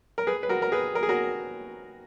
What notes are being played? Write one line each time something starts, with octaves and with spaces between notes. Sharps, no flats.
A#4
G#4 B4
B4
F#4 A#4
A#4
G#4 B4
A#4
G#4
F#4 A#4